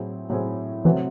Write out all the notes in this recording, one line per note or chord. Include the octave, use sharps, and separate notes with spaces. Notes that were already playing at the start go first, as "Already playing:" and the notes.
Already playing: A2 F#3 C4 E4 G#4
A2 F#3 C4 E4 G#4
C3 E3 F#3 A3 C4